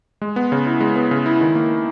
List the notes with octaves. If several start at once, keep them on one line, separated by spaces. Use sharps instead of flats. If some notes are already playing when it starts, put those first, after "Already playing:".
G#3
B3
C#3
E4
G#3
B3
C#3
E4
D#3
A#3